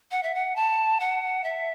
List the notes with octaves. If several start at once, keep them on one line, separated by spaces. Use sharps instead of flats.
F#5
E5
F#5
A5
F#5
E5